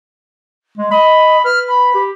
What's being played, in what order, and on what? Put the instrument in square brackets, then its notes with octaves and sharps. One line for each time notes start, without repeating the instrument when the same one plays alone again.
[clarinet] G#3
[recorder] D#5 [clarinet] B5
[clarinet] B4 [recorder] F6
[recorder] B5
[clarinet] G4